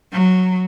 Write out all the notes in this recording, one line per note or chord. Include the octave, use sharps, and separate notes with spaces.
F#3